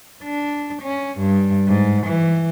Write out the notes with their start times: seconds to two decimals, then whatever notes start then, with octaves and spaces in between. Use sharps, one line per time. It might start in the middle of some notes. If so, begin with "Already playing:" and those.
0.23 D4
0.83 C#4
1.19 G2
1.67 G#2
2.07 E3